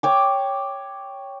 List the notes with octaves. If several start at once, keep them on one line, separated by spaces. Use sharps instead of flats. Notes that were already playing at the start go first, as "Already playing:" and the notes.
C#5 G5 D6